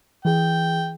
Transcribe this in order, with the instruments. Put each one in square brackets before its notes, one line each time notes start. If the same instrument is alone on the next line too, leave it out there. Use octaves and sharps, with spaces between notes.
[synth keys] E3 G#4 [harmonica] G5